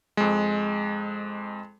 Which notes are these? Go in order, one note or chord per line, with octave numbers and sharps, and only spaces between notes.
F2 G#3